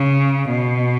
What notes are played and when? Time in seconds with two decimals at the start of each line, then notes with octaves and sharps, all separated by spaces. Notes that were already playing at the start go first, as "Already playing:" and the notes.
Already playing: C#3
0.50 B2